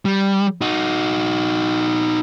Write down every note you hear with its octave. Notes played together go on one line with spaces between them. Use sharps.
G3
D#4 F#4